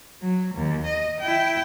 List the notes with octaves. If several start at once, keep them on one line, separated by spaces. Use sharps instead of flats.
F#3
D#2
D#5
E4 G5